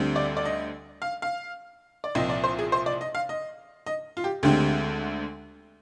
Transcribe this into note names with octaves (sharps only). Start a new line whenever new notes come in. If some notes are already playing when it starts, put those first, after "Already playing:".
Already playing: D2 D3 G3 C4
D5
D5
D#5
F5
F5
D5
C2 A#2 F3 C4 D#5
D5
C5
G#4
C5
D5
D#5
F5
D#5
D#5
F4
G4
D2 D3 G#3 C4 G4